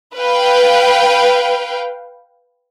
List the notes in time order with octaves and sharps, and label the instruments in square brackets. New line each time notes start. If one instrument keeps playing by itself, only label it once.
[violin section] B4 F5 G5